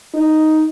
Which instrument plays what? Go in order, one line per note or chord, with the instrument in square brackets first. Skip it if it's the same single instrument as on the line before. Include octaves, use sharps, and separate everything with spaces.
[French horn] D#4